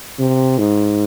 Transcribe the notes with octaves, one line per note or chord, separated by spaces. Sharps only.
C3
G#2